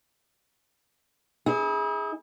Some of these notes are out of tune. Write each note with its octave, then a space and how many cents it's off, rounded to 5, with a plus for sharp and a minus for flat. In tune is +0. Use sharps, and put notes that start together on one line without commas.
E4 -40 G#4 +0